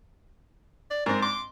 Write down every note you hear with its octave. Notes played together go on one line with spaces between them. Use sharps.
D5
G#2 C4 A#4
C6 D6